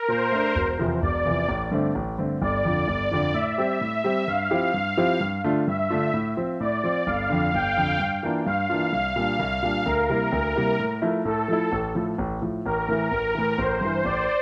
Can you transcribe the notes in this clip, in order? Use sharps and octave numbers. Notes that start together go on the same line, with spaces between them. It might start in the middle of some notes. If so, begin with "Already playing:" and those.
Already playing: A#4
A#2 C5
A3 D4
E1
E2 C3 F3
E1 D5
E2 C3 F3
A1
G2 D3 A3 C4
A1
G2 D3 A3 C4
G1 D5
F2 D3 F3
G1
F2 D3 F3
A2 E5
G3 C4 G4
A2
G3 C4 G4
G2 F5
F3 C4 E4 G4
G2 F5
F3 C4 E4 G4
G2
D3 A3 D4 F4
G2 E5
D3 A3 D4 F4
A2
F3 C4 F4
A2 D5
F3 C4 F4
G1 F5
F2 D3
G1 G5
F2 D3
G2
E3 A#3 D4 F4
G2 F5
E3 A#3 D4 F4
C2 F5
A#2 G3 D4
C2
A#2 G3 D4
D2 A#4
C3 G3 A#3 E4
D2
C3 G3 A#3 E4
A2
F3 A3 E4
A2 A4
F3 A3 E4
A1
A2 F3
A1
A2 F3
A1 A#4
A2 E3
A1 A#4
A2 E3
A1 C5
G2 E3
A1 D5